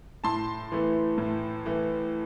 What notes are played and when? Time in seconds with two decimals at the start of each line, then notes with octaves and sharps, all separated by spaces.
0.24 A2 A5 C6
0.72 E3 A3
1.18 A2
1.66 E3 A3